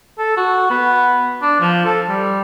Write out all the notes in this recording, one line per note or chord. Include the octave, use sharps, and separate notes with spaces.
A4
F#4
B3
D4
F3
A4
G3